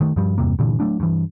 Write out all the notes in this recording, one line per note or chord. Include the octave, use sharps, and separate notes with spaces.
D#3 A3
G2 F3 G3
E2 G2 C3 A#3
G2 A#2 D3 E3
F#3 A3 D4
G2 E3